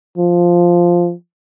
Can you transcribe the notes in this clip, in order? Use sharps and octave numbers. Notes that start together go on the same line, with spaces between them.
F3